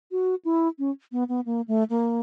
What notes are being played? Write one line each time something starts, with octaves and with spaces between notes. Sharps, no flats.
F#4
E4
C#4
B3
B3
A#3
A3
A#3